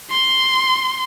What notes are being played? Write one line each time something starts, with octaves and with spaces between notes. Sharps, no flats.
C6